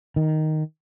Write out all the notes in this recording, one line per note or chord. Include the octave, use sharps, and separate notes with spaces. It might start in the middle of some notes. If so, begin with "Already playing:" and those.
D#3